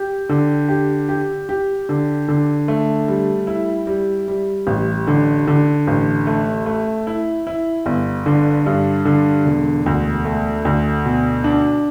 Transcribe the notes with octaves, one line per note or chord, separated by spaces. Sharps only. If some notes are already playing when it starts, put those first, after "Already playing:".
Already playing: G4
D3
G4
G4
G4
D3
D3
A3
G3
E4
G3
G3
A1
D3
D3
A1
A3
A3
E4
E4
G1
D3
G2
D3
E1
D2
A3
D2
B2
D4